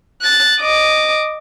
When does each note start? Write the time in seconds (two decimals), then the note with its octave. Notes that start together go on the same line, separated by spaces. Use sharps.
0.21 F#6 A6
0.60 D#5 D6